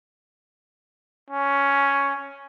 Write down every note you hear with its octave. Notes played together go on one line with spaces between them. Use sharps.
C#4